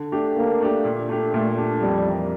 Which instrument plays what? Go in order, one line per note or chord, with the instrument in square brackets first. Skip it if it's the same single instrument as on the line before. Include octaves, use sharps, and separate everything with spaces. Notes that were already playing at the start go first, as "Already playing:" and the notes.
Already playing: [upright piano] D3
A3 D4 G4
[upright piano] D3 [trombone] A#3
[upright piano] A3 D4 G4
A#2
A3 D4 G4
[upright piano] A#2 [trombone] A3
[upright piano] A3 D4 G4
[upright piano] F2 [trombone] G3
[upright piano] E3 A#3